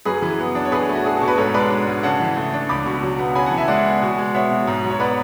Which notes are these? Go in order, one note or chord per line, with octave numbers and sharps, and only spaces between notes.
F#2 G#4 B4
E3
B3
D4
C#5
B2 G#4 B4
A3
F#4
D4 G#4
A4
B2
B4
G#2 A4 C#5
G#3 B4 D5
D4
G#2
C#3 F#5 A5
E3
A3
D4
C#2 B5 D6
B2
F#3
B3
C#3 G#5 B5
E3 F#5 A5
E5 G#5
G#3 D5 F#5
B3
B2
G#3
B3 C#5 E5
B2
G#2
F#3
C#5
B3 B4 D5